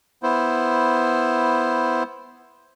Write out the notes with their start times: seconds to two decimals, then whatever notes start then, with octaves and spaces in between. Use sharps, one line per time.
0.23 B3 E4 C5